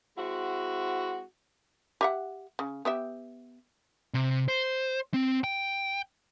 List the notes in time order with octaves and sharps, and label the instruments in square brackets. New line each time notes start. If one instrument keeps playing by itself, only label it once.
[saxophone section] G#3 C4 E4 F#4
[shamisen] G4 E5 F#5
C#3
B3 G4 E5
[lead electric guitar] C3
C5
C4
G5